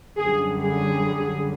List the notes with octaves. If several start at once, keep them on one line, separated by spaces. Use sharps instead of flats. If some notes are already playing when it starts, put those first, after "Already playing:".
F#2 D3 G3 G#4
G#4